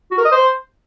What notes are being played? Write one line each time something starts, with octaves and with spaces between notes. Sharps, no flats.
F#4
A#4
D#5
C5